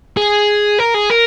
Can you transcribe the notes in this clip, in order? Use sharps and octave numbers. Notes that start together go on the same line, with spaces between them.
G#4
A#4
G#4
A#4